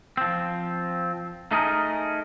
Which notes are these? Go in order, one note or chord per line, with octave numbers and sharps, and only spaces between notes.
F3 C4
A3 D#4 G#4 A#4